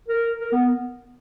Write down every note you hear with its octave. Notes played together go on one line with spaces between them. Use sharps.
A#4
A#4
B3